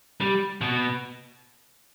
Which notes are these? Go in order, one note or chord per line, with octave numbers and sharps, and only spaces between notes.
G3
B2